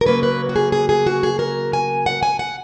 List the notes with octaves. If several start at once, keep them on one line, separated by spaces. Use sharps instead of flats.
A#4
C#3 F#3 A#3 B4
B4
F#4
G#4
G#4
G#4
F#4
G#4
A#4
G#5
F#5
G#5
F#5